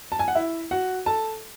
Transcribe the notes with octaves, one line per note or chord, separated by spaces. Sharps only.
A5
G#5
F#5
E4 E5
F#4 F#5
A4 A5